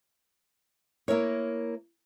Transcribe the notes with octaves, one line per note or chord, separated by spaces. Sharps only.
A#3 E4 A#4 C#5